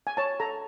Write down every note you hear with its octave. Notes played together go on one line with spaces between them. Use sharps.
G#5
C#5 A5
A4 A#5